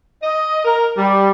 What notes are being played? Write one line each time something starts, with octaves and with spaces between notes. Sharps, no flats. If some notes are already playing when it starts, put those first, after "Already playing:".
D#5
A#4
G3